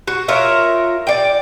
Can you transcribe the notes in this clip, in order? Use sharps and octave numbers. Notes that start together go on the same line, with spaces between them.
F#4
F4 A#4 C#5 E5
D5 G5